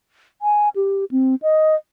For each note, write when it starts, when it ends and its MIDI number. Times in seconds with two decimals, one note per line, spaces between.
0.42 0.69 80
0.76 1.05 67
1.11 1.35 60
1.42 1.75 75